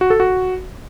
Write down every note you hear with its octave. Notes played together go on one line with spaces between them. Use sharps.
F#4
A4
F#4